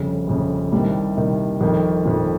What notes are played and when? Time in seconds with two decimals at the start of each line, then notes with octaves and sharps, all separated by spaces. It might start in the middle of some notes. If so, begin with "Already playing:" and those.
Already playing: G1 F2 C#3
0.27 G1 F2 C#3
0.72 C2 C3 D#3 G3
1.17 C2 C3 D#3
1.61 G1 F2 D#3
2.05 G1 F2 D#3 F3